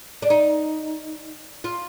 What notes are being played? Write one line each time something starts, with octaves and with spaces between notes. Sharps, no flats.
D4
D#4
F4